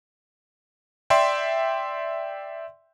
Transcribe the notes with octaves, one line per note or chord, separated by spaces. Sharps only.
D5 E5 G5 C6